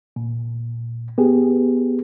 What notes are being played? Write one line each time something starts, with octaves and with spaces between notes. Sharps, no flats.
A#2
B3 G4 G#4